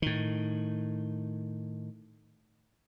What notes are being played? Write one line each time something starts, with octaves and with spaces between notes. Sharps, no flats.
A2 D#3